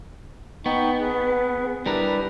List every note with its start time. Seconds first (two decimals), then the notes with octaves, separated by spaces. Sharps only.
0.66 B3 D#4 G5 C#6
1.00 G#4 B4
1.86 G3 D4 E4 A#4 B4